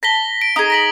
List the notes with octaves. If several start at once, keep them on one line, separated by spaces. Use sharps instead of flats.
A5 A#6 B6 G7
D7
D#4 G#4 D#6
A#6 B6 F#7